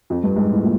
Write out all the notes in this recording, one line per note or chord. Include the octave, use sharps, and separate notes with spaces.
F2
G2
G#2
A2
A#2